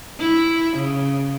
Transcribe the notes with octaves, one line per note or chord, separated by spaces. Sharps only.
E4
C#3